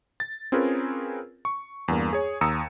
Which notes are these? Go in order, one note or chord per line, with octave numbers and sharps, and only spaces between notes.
A6
C4 C#4 F4 G#4 A#4 B4
C#6
E2 G2 A#3
G#4 C#5
D#2 A#5 D#6 E6 C#7